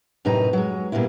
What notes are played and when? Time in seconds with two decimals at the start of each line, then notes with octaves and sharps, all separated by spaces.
0.25 F#2 A2 C3 D#4 B4 A#5
0.53 F#3 G#3
0.92 A#2 G3 A#3 B3 E4